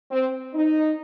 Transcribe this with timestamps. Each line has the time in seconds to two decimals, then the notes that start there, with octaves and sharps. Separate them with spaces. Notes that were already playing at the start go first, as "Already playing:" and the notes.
0.11 C4
0.54 D#4